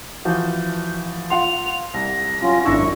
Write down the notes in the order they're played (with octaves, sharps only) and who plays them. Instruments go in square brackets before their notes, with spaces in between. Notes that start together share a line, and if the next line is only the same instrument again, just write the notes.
[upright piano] E3 F3 F#4 [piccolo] G6
[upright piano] F4 F#5 C6 [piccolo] F7
[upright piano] C2 [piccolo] A#6
[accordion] F#3 C#4 F4
[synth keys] G#1 D4 E4 [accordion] F#2 C#6 [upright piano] E6